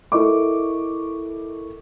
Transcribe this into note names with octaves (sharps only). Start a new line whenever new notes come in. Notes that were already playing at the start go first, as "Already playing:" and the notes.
E4 A4 A#4 D#5 C#6 D6